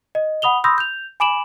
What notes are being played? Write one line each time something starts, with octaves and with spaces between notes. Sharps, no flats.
D#5
F#5 B5 D#6 F7 G7
B5 C6 D#6 E6 G6 A#6
G6 F7
G#5 B5 D6 D7 E7 F#7